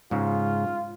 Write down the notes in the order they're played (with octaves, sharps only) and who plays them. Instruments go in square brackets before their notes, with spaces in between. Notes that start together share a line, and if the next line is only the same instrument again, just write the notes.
[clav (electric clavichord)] G#2 C#3 [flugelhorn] F4